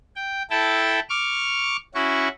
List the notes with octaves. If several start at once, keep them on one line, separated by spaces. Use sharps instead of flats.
G5
E4 A4 G5 A5
C#6 D6 F6
C#4 E4 F#4 C#6